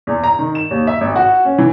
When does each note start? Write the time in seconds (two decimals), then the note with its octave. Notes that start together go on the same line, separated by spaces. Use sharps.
0.07 E2
0.24 A#5
0.39 D#3
0.55 E7
0.71 D#2
0.87 E5
1.01 G#1
1.16 F#4
1.45 C#4
1.58 E3